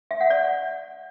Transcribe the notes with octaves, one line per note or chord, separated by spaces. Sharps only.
E5
F#5
D5